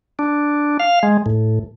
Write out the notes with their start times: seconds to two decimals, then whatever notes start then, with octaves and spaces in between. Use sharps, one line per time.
0.19 D4
0.80 F5
1.03 G#3
1.26 A2